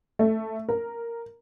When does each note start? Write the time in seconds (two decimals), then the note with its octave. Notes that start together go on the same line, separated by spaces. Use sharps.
0.19 A3
0.69 A#4